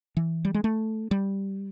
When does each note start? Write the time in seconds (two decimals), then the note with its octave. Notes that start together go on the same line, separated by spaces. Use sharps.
0.17 E3
0.45 G3
0.54 G#3
0.64 A3
1.11 G3